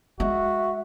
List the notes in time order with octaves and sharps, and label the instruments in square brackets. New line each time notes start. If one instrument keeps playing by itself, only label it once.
[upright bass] G#3 [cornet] F#4 [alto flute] E5